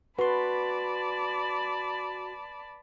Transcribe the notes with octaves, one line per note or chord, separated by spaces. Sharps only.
F#4 B4 D5 A5 B5 C6